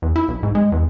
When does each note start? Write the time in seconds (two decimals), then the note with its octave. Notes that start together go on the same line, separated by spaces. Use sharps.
0.02 E2
0.16 E4
0.28 B1
0.43 G#2
0.55 G#3
0.72 E2